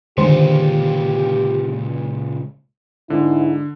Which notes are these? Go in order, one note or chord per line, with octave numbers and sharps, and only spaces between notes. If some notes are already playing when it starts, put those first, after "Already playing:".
C#2 A#2 D3 D#3 G#3 G4 C5
G#2 D3 E4